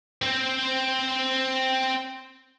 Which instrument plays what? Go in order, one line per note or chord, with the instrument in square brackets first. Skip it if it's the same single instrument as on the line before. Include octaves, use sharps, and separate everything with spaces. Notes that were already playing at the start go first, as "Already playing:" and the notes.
[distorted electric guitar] C4 C5